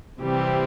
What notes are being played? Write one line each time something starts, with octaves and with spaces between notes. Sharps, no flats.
C3 E3 G3 C4 G4